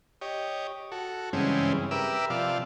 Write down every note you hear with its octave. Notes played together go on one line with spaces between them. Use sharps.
G4 C#5 D#5
F#4 A4
G2 C#3 E3 G#3 C4 C#4
G4 A#4 B4 E5 D6 E6
C3 F3 D5 F5